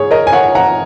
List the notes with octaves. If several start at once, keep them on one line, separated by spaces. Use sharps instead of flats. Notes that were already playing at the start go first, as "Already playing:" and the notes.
Already playing: G#2 G#4 C#5
A#4 D#5
G#5
C#5 F#5
F#5 A#5